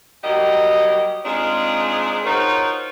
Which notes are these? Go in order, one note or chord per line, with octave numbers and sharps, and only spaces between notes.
F#3 G3 A#3 G4 D#5
G#3 C4 D4 D#4 F4 G#4
D#4 F4 F#4 A#4 C5 C#5